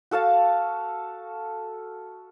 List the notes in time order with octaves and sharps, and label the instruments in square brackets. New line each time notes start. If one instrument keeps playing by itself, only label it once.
[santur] F#4 A4 F5 A5